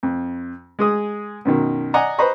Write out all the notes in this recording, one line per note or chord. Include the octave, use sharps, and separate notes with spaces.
F2
G#3 G#4 D#6
F#2 B2 D#3
D5 D#5 F#5 G#5 A#5
B4 C5 D#5 A#5 B5 C#6